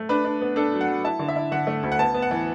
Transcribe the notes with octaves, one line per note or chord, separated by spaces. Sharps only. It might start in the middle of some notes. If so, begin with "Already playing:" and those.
Already playing: A3
D4 B4
D4
B3
D4 A4
F#3
F#5
F#3
E4 A5
D3
E5
E4
D3 F#5
A3
D2
F#5
B3 A5
B3
F#5
E3